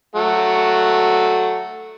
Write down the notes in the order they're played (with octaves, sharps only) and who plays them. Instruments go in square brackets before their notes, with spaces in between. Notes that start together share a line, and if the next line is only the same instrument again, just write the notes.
[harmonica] F#3 A3 F#4